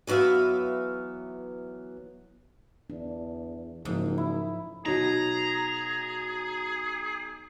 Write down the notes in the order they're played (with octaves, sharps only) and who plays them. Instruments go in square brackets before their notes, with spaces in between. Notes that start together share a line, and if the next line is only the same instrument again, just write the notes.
[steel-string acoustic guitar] E3 F#3 B3 E5 F5
[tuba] E2 [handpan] D4
[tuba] F#1 [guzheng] G#2 [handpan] F3 D#4 A#4
[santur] E4
[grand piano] B2 F#3 D#4 [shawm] G#4 [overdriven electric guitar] A#5